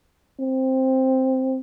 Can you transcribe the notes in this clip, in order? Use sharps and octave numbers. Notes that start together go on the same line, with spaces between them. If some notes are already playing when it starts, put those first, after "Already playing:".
C4